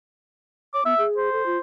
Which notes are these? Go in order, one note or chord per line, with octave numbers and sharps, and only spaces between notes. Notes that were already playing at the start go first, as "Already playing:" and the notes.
C#5 D6
B3 E5
G#4
C5
A4
F4